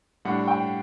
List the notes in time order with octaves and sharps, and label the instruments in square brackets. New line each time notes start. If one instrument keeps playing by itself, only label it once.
[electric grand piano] A2 G3 D4 [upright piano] F#5
[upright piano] G5